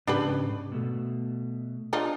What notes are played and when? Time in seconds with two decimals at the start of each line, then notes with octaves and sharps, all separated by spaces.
0.07 G#2 C#3 D4 G4 B4
0.72 B2 A3
1.93 D4 D#4 F4